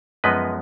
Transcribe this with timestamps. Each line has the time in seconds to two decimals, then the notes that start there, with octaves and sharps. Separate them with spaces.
0.24 F#2 F3 G#3 B3 B4 D#5